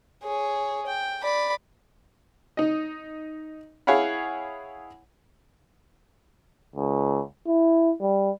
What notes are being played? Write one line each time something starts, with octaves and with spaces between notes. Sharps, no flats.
G#4 C#5
G5
D5 B5
D#4 D#5
E4 G#4 C#5 F5 F#5 B5
C#2
E4
G3